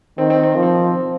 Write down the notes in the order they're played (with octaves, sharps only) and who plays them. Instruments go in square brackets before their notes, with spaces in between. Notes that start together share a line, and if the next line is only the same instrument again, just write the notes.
[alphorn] D#3 [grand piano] C4
[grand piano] C4
C4
[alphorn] F3
[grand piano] C4